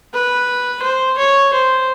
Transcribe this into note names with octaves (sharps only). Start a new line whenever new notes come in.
B4
C5
C#5
C5